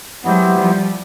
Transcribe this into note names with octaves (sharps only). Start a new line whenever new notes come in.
F#3 G#3 B3 E4 G4 C5
F3 G3